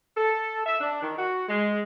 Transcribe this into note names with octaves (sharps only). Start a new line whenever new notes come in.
A4
E5
D4
D#3
F#4
G#3